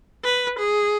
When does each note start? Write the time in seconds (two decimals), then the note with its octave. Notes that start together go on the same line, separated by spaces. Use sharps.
0.24 B4
0.59 G#4